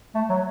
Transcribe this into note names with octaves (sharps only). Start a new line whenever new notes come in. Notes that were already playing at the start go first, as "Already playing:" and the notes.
A3
F#3